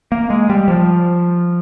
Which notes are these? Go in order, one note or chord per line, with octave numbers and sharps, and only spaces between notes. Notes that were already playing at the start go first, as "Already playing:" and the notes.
A#3
G#3
G3
F3